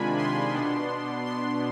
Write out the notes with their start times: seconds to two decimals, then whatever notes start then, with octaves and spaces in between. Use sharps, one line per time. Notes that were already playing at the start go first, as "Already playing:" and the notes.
Already playing: C3 D#3 G#3 D4 F4 G#5 B5
0.19 C6
0.54 B2 B3 D4
1.26 C6